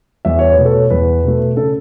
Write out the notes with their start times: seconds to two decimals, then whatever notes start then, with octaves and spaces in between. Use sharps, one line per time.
0.25 E2 E5
0.39 C#5
0.53 B4
0.58 B2 A3
0.65 A4 C#5
0.90 E2 B4
1.24 B2 A3
1.57 C#3 A4